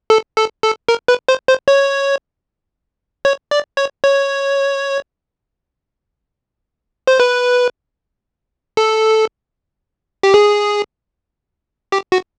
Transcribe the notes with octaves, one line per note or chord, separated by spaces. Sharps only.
A4
A4
A4
A#4
B4
C5
C5
C#5
C#5
D5
C#5
C#5
C5
B4
A4
G4
G#4
G4
F#4